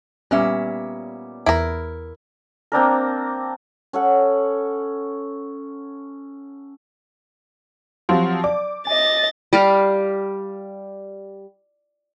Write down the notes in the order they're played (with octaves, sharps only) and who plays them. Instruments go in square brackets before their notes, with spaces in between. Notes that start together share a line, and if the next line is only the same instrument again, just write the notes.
[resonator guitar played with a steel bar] A#2 C#4 E5 [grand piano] G3 B3 D6
[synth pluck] E2 D7 [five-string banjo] E4 A#4
[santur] A#3 C4 D4 A#4
[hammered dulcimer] C#4 A4 F#5
[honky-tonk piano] F3 F#3 C4 [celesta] G4 C6
[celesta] D5 [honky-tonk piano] D6
[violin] D#5 A6 [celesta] G#5
[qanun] G3 G4 F5